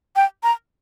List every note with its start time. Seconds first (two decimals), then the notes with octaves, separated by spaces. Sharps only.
0.16 G5
0.43 A#5